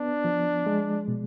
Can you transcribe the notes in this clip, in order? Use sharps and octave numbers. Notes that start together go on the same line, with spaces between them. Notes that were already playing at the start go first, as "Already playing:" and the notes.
Already playing: B3 D4
F3
G#3
B2